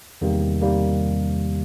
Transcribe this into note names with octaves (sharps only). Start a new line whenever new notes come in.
E2 C3 D#3 G3 A#3
C3 D#3 G3 A#3